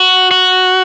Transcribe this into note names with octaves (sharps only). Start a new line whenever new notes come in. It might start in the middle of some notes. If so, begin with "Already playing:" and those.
Already playing: F#4
F#4